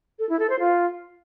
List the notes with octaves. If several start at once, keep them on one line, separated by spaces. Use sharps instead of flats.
A4
E4
A4
C5
F4